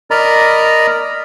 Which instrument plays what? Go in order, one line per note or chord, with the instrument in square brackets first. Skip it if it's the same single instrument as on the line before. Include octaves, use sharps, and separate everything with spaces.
[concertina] A#4 D5 D#5 A#5 B5